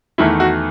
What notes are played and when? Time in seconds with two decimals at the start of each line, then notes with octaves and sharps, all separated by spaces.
0.18 E2 D#3 A3 E4
0.40 F#4